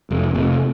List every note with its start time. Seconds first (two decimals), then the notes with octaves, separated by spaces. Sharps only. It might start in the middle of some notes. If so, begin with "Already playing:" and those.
0.11 F1
0.35 F1